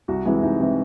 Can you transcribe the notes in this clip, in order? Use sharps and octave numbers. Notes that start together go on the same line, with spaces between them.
C2 F#4
C3 E3 G#3 E4
C2 D#4
C3 E3 G#3